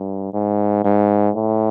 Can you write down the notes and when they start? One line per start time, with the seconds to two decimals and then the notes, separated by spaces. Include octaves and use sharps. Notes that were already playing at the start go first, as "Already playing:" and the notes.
Already playing: G2
0.33 G#2
0.84 G#2
1.35 A2